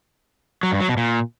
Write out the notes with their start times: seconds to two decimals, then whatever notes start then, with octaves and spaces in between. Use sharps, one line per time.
0.63 F#3
0.72 G2
0.80 F#3
0.89 B2
0.97 A#2